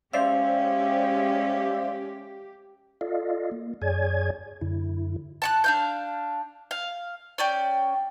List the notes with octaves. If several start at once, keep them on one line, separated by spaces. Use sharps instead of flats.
G#3 C#4 G4 C5 D5 E5 F5
F4 A4 D5 D#5 F5
A#3
F#2 G#4 C#5 D5 G#5 G#6
F#2 D3 E4
A5 C#6 F#6
D4 F5 G6
F5
C#4 D5 G5